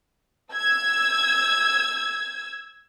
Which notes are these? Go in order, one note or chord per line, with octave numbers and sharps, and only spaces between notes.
E6 G#6